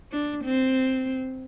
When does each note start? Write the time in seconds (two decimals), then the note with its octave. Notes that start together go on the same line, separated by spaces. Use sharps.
0.12 D4
0.44 C4